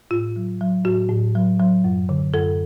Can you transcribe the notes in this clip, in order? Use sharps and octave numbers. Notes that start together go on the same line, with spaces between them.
A2 F4
F#3
F#3
A2 F#4
A2
F#3
F#3
F#2
D3
F#2 A4